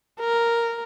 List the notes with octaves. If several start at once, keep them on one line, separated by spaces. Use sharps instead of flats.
A#4